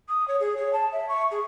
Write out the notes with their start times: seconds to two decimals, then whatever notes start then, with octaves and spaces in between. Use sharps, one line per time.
0.09 D#6
0.28 C#5
0.40 G#4
0.57 C#5
0.73 A5
0.92 E5
1.09 C#6
1.31 G#4